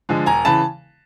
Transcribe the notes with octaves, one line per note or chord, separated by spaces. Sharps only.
D3 F3 G#3
E1 G#5 A#5
C#3 E3 A5 B5